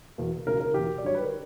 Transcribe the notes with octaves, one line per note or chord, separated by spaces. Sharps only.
E2 B2 A#3
C#2 B2 A#3 A#4
A#4
E2 B2 A#3 G4
D5
G2 D3 F#3 C#5
B4
A#4